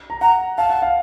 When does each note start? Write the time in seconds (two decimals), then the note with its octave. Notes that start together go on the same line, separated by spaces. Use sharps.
0.10 A#5
0.21 F#5 A#5
0.58 F5 A5
0.70 F#5
0.82 F5